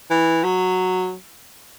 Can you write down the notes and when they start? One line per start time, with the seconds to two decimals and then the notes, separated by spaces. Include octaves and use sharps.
0.11 E3
0.44 F#3